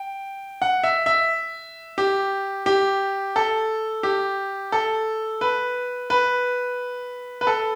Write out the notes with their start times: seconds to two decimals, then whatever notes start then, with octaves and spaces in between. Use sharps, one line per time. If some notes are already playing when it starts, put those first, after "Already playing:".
Already playing: G5
0.62 F#5
0.84 E5
1.06 E5
1.98 G4
2.66 G4
3.36 A4
4.03 G4
4.72 A4
5.41 B4
6.10 B4
7.41 B4
7.47 A4